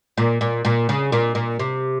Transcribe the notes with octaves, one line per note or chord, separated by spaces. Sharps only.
A#2
A#2
A#2
C#3
A#2
A#2
C3